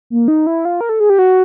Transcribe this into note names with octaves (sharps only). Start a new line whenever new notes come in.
A#3
D#4
E4
F4
A#4
A4
G#4
G4
F#4